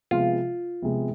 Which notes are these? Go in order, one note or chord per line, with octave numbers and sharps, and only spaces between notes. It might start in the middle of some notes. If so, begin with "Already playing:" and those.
C3 F3 G#3 B3 F4
C3 F3 G#3 B3